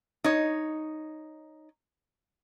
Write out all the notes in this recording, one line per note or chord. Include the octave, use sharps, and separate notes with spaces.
D#4 C#5